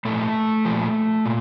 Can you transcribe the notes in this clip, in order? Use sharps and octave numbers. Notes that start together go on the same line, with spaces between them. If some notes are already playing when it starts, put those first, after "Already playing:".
A#2 F3 A3
F3
A#2
A#2